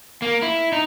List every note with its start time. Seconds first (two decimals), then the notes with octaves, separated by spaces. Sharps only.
0.22 A#3
0.42 E4
0.72 D#4